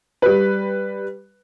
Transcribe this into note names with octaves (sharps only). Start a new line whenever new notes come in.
G3 B4